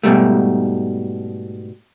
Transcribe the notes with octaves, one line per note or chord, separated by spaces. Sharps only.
G#2 B2 G3 A3